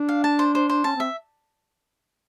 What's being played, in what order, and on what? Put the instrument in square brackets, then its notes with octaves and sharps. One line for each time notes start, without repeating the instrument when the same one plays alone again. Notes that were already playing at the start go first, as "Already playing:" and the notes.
Already playing: [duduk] D4
[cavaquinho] F5
A5
C5
C5
C5
[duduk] C#4 [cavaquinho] A5
[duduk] C4 [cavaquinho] E5